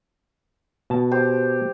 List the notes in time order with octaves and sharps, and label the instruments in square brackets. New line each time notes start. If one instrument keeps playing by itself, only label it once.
[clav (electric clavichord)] B2 A5
[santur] G4 C5